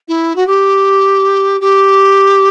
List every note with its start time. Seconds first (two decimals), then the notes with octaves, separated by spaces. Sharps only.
0.08 E4
0.36 F#4
0.47 G4
1.61 G4